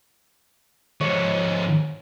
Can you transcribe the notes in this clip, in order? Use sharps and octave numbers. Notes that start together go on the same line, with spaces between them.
G#2 F3 C#5